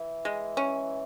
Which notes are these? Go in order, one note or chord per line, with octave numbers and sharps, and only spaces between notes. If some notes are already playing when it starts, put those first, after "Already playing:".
Already playing: E3
G#3
C#4